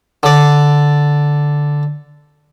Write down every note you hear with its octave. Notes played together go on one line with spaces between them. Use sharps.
D3 D5